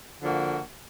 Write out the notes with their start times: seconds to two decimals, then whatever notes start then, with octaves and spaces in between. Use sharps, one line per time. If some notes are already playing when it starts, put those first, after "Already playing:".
0.21 D3 F3 A#3 D4 F#4